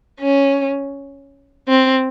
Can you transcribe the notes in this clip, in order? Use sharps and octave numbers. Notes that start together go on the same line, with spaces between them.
C#4
C4